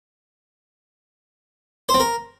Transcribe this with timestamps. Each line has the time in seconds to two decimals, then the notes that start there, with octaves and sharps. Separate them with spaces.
1.89 C5
1.94 C4
2.00 A#4